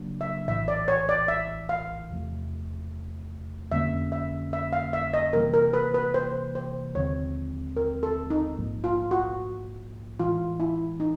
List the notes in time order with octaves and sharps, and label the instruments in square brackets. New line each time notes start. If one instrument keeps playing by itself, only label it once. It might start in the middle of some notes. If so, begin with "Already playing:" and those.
Already playing: [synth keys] C#3 F#3 A#3 D4
[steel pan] E5
[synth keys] A#1 A2 E3 [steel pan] E5
[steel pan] D5
C#5
D5
E5
F5
[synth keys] E2 C3 F3 A3
[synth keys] F2 D3 G3 A#3 C#4 [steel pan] E5
[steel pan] E5
E5
F5
E5
D#5
[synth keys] C3 E3 G3 A#3 [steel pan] A#4
[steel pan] A#4
B4
B4
C5
C5
[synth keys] D#2 D3 F3 G#3 C4 [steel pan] C#5
[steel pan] A#4
A4
D#4
[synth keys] A#1 G#2 F3 A#3
[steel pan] F4
F#4
[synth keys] A2 E3 G#3 [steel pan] F4
[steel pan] E4
D#4